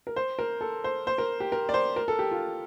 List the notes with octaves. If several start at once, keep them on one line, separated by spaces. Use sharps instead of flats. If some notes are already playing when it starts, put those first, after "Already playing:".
A#4
C5
A#4
A4
C5
C5
A#4
G4
A#4
D5
C5
A#4
A4
G4
F4